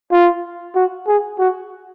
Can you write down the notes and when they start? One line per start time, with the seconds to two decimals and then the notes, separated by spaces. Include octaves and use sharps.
0.12 F4
0.75 F#4
1.08 G#4
1.39 F#4